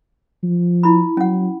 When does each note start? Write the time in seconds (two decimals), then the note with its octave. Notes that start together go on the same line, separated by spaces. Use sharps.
0.43 F3
0.83 E4 B5
1.17 F#3 C#4 F#5